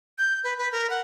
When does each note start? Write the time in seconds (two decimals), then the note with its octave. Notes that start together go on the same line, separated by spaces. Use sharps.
0.18 G6
0.44 B4
0.58 B4
0.72 A#4
0.90 F#5